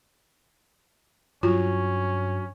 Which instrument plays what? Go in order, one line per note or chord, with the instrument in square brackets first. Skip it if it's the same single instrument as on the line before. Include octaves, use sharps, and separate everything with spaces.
[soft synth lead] G2 [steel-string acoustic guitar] F#3 [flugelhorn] C#4 [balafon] F4